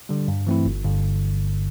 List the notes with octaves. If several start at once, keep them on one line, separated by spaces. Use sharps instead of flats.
D3 G3
G2
E3 A3 C4 E4
G1
G2 D3